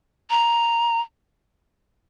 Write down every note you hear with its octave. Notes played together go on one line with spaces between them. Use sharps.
A#5